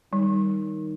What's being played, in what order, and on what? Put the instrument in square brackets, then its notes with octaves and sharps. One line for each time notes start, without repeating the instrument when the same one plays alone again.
[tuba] D#3 [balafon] G3